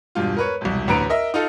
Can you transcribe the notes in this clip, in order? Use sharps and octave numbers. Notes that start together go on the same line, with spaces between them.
E1 G2 F4
A#4 B4 C#5
E1 C2
A1 D2 B4 A#5 D7
A#4 D#5 E5
D#4 F4 A4